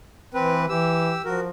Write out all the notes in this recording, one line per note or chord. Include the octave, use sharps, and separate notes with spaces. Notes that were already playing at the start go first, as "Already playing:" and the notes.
E3 C4 B4
E3 G4 E6
F3 F#4 A#4